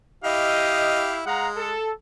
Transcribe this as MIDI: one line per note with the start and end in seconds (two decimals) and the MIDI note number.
0.24 1.23 64
0.24 1.23 67
0.24 1.05 75
0.24 1.23 77
1.26 1.71 56
1.26 1.48 77
1.26 1.48 78
1.26 1.48 82
1.56 1.90 69